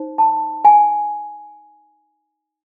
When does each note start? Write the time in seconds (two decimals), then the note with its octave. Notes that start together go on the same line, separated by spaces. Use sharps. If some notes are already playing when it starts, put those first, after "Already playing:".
Already playing: D#4 C5
0.18 A5
0.65 G#5